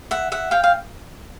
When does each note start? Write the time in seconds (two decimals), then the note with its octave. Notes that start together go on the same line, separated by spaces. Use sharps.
0.11 E5 F#5
0.32 E5 F#5
0.51 F5 G5
0.64 F5